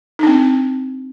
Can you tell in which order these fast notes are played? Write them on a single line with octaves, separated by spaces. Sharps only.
D#4 D4 C4